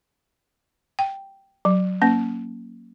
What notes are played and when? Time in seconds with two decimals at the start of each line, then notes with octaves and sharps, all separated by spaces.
0.99 G5
1.65 F#3
2.02 A#3 C#4